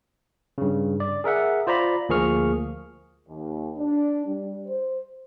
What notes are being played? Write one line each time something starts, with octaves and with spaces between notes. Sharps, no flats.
G2 C#3
D5
G#4 A#4 E5 F#5
F4 C5 D5 A#5 B5
D2 F3 A#3 G#4 C#6 F6
D#2
D4
G3
C5